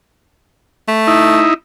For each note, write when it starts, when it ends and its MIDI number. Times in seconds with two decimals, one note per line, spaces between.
0.88 1.45 57
1.07 1.54 63
1.07 1.54 64